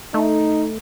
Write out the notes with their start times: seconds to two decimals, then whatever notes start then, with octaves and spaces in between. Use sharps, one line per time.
0.14 A3 D#4